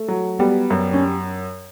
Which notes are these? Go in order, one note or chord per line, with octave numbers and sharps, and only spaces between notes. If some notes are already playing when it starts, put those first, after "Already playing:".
Already playing: A3
F#3
G3 B3
F#2
C#4